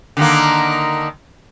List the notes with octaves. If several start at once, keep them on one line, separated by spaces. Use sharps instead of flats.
D3 D#3 A#3